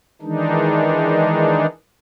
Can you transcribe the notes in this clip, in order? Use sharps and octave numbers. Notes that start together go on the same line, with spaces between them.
D#3 E3 G#3 D4 D#4